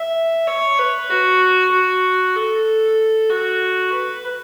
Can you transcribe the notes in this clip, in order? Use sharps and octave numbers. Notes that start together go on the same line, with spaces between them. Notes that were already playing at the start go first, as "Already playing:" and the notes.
Already playing: E5
C#5
B4
F#4
F#4
A4
F#4
B4